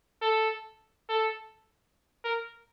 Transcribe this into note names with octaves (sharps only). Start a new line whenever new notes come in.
A4
A4
A#4